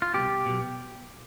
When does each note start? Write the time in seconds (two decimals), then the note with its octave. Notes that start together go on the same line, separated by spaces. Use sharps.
0.02 F4
0.14 C2 B2 G4
0.46 B1 B2